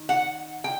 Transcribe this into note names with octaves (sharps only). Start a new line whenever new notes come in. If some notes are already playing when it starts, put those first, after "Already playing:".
Already playing: D#3
F#5
G5